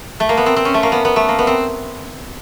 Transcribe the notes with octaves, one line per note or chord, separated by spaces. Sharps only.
A3
A#3
B3
C4
C4
C#4
A3
A#3
B3
B3
A3
A#3
B3
C4